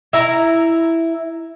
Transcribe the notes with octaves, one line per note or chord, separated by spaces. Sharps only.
E4 A#5